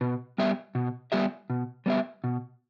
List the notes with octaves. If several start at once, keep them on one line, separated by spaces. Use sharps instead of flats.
B2
G3 B3 G4 E5
B2
G3 B3 G4 E5
B2
G3 B3 G4 E5
B2